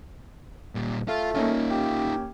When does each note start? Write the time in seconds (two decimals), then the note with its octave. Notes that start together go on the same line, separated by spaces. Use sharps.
0.75 A#2 G3
1.08 A3 F4
1.35 A#3 C#4 D#4 F4
1.71 G4